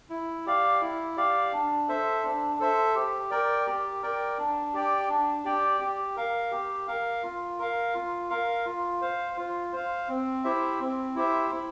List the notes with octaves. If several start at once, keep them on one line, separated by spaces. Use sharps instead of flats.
E4
G4 D5 F5
E4
G4 D5 F5
D4
A4 C5 E5
D4
A4 C5 E5
G4
A#4 D5 G5
G4
A#4 D5 G5
D4
G4 D5 G5
D4
G4 D5 G5
G4
A#4 F5
G4
A#4 F5
F4
A#4 F5
F4
A#4 F5
F4
C5 F5
F4
C5 F5
C4
E4 G4 C5 E5
C4
E4 G4 C5 E5
E4